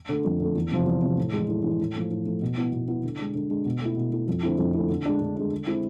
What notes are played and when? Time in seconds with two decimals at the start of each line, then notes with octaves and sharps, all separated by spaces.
0.09 D3 A3
0.25 F2
0.40 D3 A3
0.55 E2
0.71 C3 F3
0.86 E2
1.02 C3 F3
1.18 A2
1.33 E3 G#3
1.48 A2
1.64 E3 G#3
1.80 A2
1.95 F3 A3
2.11 A2
2.26 F3 A3
2.42 B2
2.57 B3 E4
2.72 B2
2.88 B3 E4
3.03 D3
3.19 G#3 D4
3.35 D3
3.50 G#3 D4
3.65 B2
3.81 A3 E4
3.96 B2
4.12 A3 E4
4.27 F2
4.43 D3 A3 C4 E4
4.58 F2
4.74 D3 A3 C4 E4
4.89 D3
5.05 G#3 D4
5.21 D3
5.37 G#3 D4
5.52 D3
5.67 G#3 C4 E4